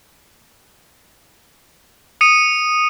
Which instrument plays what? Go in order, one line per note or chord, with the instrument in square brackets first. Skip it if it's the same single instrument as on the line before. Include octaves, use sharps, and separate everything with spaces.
[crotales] D#6 C#7 D#7